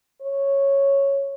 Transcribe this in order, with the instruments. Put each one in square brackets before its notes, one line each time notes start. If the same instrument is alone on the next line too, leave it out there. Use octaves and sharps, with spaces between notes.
[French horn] C#5